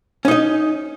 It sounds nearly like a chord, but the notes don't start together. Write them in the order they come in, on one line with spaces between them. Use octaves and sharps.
C#4 D#4 D#5